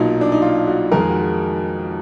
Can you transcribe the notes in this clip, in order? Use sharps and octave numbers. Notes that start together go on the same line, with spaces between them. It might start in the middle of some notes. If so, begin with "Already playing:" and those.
Already playing: B1 A#2 F#3 D#4
D4
D#4
F4
F#4
F2 D#3 G#3 A#4
G#4
F#4
G#4